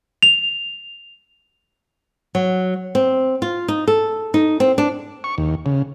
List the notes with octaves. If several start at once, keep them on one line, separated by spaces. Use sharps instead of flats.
F7
F#3
C4
F4
D#4
A4
D#4
C4
D4
C#6
D#2
C#3